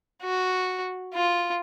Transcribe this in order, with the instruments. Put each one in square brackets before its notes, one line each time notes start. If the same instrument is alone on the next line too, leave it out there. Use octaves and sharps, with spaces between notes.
[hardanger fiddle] F#4
F4